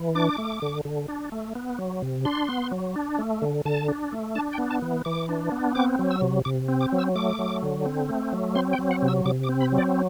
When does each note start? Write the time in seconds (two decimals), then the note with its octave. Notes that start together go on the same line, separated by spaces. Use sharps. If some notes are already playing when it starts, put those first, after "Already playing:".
Already playing: E3
0.15 D4 D6
0.38 A3
0.62 D3
0.85 D3
1.08 D4
1.32 A3
1.55 B3
1.78 F#3
2.02 C3
2.25 D4 C6
2.48 B3
2.72 F#3
2.96 D4
3.19 A3
3.42 D3
3.65 D3 A5
3.88 D4
4.12 A3
4.35 D4 A5
4.53 G5
4.58 B3
4.70 A5
4.82 E3
5.05 E3 D6
5.29 D4
5.52 B3
5.75 C4 D6
5.99 F#3
6.10 E6
6.22 C3
6.45 C3 D6
6.68 C4
6.80 D6
6.92 F#3
6.98 E6
7.15 A3 D6
7.39 F#3
7.63 D3
7.86 C4
8.09 A3
8.32 F#3
8.55 C4 C6
8.73 G5
8.79 F#3
8.91 F#5
9.02 C3
9.08 E6
9.25 C3 D6
9.43 D6
9.49 C4
9.60 B5
9.72 F#3
9.78 D5